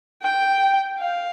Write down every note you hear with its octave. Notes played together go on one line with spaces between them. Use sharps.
G5
F5